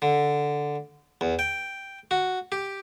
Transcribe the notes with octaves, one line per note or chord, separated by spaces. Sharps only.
D3
E2
G5
F#4
G4